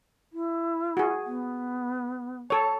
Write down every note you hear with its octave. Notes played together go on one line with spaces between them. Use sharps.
E4
F#4 G#4
B3
A4 C#5 A5